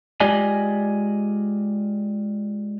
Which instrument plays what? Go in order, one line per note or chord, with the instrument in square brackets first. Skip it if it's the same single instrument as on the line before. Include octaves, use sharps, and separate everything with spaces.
[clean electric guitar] G#3 F4 G4 D5 D#5 G#5